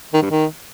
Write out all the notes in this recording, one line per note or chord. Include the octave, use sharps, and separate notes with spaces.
D#3
G2
D#3